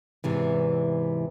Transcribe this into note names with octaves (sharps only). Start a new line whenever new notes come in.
E2 G#2 C3 E3